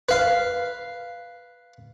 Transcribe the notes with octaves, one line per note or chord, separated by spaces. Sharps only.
B4 F5